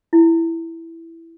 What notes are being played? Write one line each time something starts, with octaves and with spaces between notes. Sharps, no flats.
E4